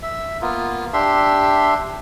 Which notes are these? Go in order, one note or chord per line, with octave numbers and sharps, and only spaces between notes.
E5
A#3 B3 F4
D4 G4 E5 C6